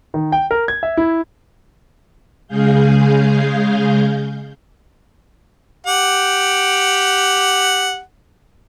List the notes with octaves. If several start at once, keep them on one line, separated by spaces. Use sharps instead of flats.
D#3
G5
A#4
G#6
E5
E4
C#3 G#3 G#4 F5 G6
G4 F#5